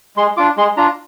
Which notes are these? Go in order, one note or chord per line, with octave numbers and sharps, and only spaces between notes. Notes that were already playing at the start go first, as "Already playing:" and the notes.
G#3 C6
D4 F4 D6
G#3 C6
D4 F4 A#5